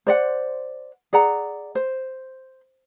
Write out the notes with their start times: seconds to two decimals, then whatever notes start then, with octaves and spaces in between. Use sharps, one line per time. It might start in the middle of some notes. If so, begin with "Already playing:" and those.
0.07 C5 D5 F#5
1.13 G#4 D5 F#5 A#5
1.75 C5